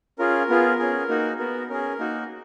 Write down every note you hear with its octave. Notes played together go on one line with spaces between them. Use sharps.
C#4 F4 G#4 A#4
B3 F4 G#4
C#4 G#4
A#3 D#4 F#4
B3 F#4 A#4
C#4 G#4 A#4
A#3 D#4 F#4